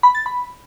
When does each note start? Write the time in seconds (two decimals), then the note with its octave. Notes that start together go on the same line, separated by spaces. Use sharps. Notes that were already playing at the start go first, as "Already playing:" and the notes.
0.03 B5
0.15 A6
0.26 B5